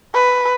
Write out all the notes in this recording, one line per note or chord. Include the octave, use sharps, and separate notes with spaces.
B4